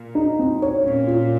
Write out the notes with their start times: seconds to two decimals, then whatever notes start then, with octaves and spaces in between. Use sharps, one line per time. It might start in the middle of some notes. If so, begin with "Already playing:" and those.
Already playing: A#2
0.15 D#4
0.39 C4
0.62 C#5
0.84 A#2 C#4
1.07 F4